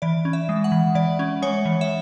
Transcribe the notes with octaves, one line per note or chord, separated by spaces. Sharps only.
E3 D5
C#4
E5
G#3
F#5
E3
E3 D5
C#4
G#3 C#5
E3
E5